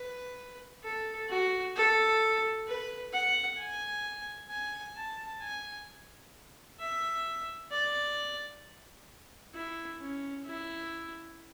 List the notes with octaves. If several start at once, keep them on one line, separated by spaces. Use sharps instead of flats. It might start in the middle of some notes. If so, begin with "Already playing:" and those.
Already playing: B4
A4
F#4
A4
B4
F#5
G#5
G#5
A5
G#5
E5
D5
E4
C#4
E4